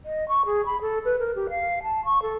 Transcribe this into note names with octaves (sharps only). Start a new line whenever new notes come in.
D#5
C#6
G#4
B5
A4
B4
A#4
G4
F5
A5
C#6
A4